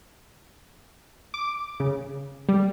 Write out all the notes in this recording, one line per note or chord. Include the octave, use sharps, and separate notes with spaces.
D6
C#3
G3